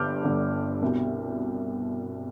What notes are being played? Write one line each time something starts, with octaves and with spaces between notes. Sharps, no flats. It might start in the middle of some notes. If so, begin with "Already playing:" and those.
Already playing: G1 G2 D3 G3 D6 F6 G6
G1 G2 D3 G3
C2 B2 G3